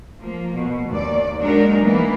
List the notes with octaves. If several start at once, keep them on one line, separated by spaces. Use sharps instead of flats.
F3 A#3
B2
D#2 D5
F#3 G#3 A#3 D4 D#4 A#4
E3 A#3 B3